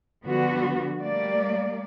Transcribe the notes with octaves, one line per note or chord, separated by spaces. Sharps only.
D3 F3 G3 B3 F#4
G3 A3 A#3 D5